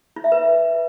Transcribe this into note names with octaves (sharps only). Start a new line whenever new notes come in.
F4
E5
B4